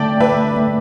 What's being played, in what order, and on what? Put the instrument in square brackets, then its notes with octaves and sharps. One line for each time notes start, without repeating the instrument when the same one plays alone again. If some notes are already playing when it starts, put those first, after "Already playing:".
Already playing: [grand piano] D3 A3 [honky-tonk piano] D5 E5 G5 A5
[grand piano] A3 [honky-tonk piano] B4 E5
[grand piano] A3